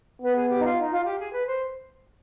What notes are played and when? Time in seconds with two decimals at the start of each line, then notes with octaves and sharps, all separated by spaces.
0.22 B3 B4
0.36 G#4
0.49 G4
0.57 D#4
0.63 F4
0.77 D#4
0.90 F4
1.04 G4
1.18 G#4
1.31 B4
1.45 C5